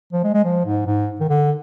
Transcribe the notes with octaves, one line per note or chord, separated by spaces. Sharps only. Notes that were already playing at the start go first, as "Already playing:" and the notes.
F3
G#3
G#3
F3
G#2
G#2
D#3
D3